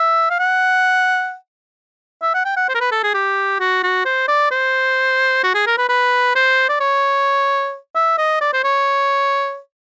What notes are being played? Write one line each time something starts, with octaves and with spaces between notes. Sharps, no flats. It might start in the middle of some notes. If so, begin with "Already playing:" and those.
Already playing: E5
F5
F#5
E5
F#5
G5
F#5
C5
A#4
B4
A4
G#4
G4
F#4
F#4
C5
D5
C5
F#4
G#4
A#4
B4
B4
C5
D5
C#5
E5
D#5
D5
C5
C#5